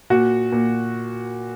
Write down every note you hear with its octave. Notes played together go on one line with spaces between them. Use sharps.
A#2 F#4
A#2